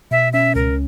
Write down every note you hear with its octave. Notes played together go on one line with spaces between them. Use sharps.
B2 E5
C#4 E5
C#2 A#4